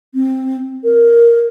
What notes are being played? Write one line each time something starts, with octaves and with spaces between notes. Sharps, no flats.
C4
A#4